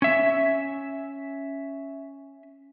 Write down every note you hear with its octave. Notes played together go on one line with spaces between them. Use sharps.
C#4 E5